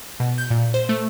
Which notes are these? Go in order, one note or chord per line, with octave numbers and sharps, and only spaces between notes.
B2
G6
A#2
C5
A3